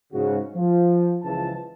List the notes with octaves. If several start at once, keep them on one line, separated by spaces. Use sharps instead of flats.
G#2 C#3 F#4
F3
C#2 C#3 E3 F3 A5